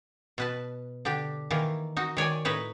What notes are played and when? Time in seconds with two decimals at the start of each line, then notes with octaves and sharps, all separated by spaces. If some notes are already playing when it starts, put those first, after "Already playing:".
0.38 B2 B4 A5
1.05 D3 D4 G4
1.51 D#3 E3 A#3
1.97 D#4 F#4
2.17 D#3 C#5 D5 G#5
2.45 A2 D#4 B4 C#5